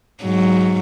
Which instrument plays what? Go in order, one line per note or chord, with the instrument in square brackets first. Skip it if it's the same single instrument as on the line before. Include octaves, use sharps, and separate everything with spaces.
[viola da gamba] G#2 F#3